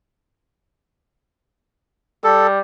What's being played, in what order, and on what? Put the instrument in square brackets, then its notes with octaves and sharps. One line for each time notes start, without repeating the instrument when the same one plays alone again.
[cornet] G3 [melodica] A4